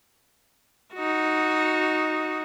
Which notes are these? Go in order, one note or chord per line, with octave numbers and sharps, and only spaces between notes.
D#4 F#4